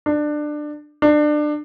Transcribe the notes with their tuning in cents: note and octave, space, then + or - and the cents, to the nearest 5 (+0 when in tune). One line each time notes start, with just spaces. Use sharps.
D4 +20
D4 +25